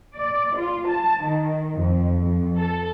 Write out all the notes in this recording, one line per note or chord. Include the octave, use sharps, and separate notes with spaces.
D5
F4
A5
D#3
F2
F2
A4